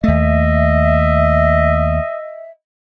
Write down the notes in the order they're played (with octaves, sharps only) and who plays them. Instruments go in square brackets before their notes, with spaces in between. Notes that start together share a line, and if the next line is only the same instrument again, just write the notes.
[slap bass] D#2 A3 [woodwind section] D#5 E5